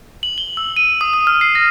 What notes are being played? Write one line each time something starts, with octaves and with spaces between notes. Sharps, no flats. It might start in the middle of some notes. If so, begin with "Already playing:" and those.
F#7
G7
E6
D#7
D#6
D#6
F6
C7
A#6